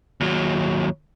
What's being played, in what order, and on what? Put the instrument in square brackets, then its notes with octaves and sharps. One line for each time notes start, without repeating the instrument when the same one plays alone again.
[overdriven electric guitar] D#2 F#3